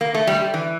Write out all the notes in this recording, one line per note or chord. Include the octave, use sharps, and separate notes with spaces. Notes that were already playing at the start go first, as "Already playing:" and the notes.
A#3
A3
G3
E3